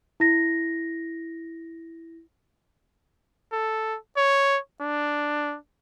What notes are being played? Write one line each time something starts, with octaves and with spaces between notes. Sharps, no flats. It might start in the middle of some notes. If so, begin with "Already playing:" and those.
E4 A#6
A4
C#5
D4